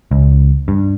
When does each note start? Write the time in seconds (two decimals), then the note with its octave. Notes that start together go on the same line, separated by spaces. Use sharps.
0.11 C#2
0.68 G2